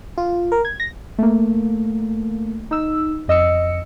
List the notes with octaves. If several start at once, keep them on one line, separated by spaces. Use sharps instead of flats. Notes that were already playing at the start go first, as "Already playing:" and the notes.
F4
A#4
G#6
A#6
A3 A#3
D#4 E6
F2 D#5 E6 C#7